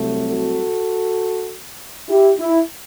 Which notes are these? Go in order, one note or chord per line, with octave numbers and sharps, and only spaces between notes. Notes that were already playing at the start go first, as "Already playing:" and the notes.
Already playing: C2 C3 F#3 A3
F#4 A4
E4 G4
E4